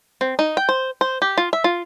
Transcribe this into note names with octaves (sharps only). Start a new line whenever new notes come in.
C4
D#4
G5
C5
C5
G4
F4
E5
F4